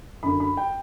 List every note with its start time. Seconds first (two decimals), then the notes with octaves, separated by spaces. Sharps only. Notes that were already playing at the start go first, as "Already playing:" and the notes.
0.23 F#2 D3 B5
0.40 B5
0.57 G5